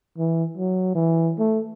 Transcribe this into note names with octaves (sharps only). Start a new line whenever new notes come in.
E3
F#3
E3
A3